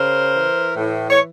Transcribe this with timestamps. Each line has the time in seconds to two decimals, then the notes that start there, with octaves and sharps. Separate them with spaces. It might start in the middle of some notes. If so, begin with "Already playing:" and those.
Already playing: C#3 A#4 C5
0.34 E3
0.76 A2
1.10 C#5